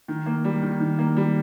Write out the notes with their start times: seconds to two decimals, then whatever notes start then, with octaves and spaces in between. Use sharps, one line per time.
0.08 D#3
0.26 A#3
0.45 G3
0.62 D#3
0.80 D#3
0.99 A#3
1.17 G3